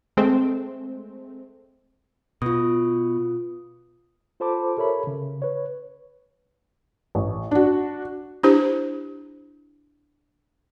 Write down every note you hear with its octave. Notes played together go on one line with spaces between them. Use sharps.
G#3 A3 C4
B2 F4 B4 D#6
F4 A4 C5 A5 B5 D6
G4 A4 A#4 C#5 E5 B5
C#3
B4 C#5
A1
D4 F#4
D4 E4 G4 C5